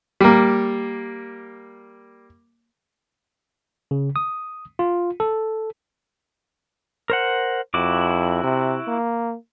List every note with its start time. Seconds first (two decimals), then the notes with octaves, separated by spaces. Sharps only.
0.21 G3 A#3
3.91 C#3
4.16 D#6
4.79 F4
5.20 A4
7.10 A#4 C5 F#5
7.74 F2 E4 F#4 D6
8.43 C3
8.88 A#3